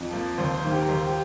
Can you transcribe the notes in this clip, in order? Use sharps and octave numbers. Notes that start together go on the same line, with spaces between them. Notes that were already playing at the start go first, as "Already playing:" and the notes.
Already playing: F2
F3 A#3
D#2 C5
C5
D#3 A#3
G4
A#4
D#2 C5
G4